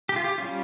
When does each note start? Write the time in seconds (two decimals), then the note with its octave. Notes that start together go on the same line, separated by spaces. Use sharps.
0.09 G4
0.16 F4
0.24 G4
0.38 G3 C#4 F4